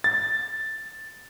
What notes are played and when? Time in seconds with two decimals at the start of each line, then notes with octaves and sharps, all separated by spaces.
0.04 A6